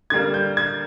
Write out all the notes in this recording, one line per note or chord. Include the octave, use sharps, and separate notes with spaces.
D3 G3 A#3 G#6
G6
G#6